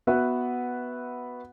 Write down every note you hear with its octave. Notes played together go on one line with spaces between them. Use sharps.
B3 F#4 B4 E5 F#5